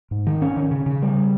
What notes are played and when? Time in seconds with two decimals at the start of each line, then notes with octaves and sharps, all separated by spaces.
0.11 G#2
0.27 D#3
0.42 C#4
0.57 D#3
0.71 C#3
0.86 C#3
1.02 G3